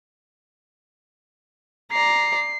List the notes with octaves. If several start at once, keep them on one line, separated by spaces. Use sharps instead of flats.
D5 A#5 C7